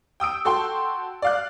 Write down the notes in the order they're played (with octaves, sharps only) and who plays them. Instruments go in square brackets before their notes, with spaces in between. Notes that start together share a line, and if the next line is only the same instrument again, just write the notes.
[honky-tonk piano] G5 D#6 E6 D7
F#4 A4 G5 C6
D5 F5 F#6